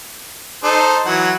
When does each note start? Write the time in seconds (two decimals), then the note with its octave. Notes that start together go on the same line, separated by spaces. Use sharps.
0.64 D#4 A4 C5
1.06 E3 F#3 F#5